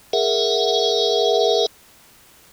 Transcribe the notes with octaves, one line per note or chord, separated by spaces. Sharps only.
G#4 A#4 E5 F#5